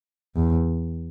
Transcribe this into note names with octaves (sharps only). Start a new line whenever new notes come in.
E2